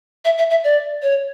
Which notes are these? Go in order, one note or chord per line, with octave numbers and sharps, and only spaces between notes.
E5
E5
E5
D5
C#5